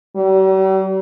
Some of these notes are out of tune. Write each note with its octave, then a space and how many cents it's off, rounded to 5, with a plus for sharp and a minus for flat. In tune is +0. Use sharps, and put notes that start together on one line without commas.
G3 -45